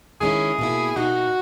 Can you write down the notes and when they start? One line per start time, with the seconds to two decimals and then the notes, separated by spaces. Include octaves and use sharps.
0.21 D#3 G#3 C#4 E4 G#4
0.59 B2 A#3 E4
0.96 B2 A#3 D#4 F#4